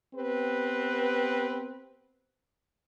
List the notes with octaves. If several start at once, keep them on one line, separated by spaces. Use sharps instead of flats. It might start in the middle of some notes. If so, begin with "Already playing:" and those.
B3 C4 G4 B4